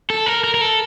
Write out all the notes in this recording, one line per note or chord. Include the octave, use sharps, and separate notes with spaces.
A4
A#4
A#4
A#4
A4